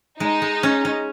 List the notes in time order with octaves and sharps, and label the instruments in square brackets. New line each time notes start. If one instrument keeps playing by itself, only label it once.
[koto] G#3 [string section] D#4
[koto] G#3
C#4
C#4